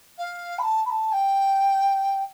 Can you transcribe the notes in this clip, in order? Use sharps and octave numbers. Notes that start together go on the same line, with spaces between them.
F5
B5
A5
B5
A5
G5